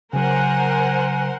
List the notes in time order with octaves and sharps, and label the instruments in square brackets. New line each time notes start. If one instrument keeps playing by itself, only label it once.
[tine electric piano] C#3 F#3 [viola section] A#4 C5 F#5 [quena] G#5